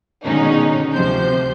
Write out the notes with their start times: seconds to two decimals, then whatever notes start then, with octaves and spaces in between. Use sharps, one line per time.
0.24 B2 D3 D#3 G#3 C#4 D#4
0.92 D2 C3 F3 C5 G6